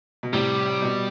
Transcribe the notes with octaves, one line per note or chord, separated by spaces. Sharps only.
B2
A2 C3 G3
B2